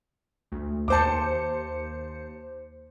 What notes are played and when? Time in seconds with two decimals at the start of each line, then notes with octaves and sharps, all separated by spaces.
0.52 D2
0.88 D#2 C5 A5 D6 C#7